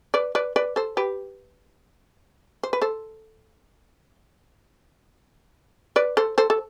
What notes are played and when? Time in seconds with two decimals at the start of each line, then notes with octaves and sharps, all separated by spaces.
0.14 B4 D5
0.35 B4 D5
0.56 B4 D5
0.76 A4 C5
0.97 G4 B4
2.63 C5
2.73 B4
2.81 A4 C5
5.96 B4 D5
6.17 A4 C5
6.38 A4 C5
6.50 A4